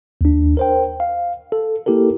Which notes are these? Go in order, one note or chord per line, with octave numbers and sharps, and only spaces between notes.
D#2 D4
A#4 C5 G5
F5
A4
A#3 E4 G4 A4 A#4